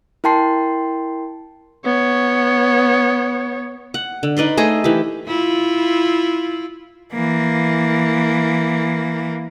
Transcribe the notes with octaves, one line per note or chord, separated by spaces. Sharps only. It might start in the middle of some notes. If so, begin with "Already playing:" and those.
E4 A#4 G5 A5 C6 C7
B3 C#5
F#5
D3
D#4 B4 D5 C6
A3 G#4 C5 D#5
E3 G4
E4 F4
E3 A#3